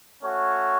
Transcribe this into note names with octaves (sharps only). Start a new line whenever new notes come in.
A3 C#4 F#4 C#5